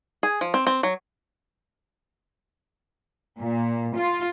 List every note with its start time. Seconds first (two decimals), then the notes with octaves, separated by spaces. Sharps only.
0.23 G#4
0.41 F3
0.54 C4
0.67 C4
0.83 F#3
3.40 A#2
3.97 F4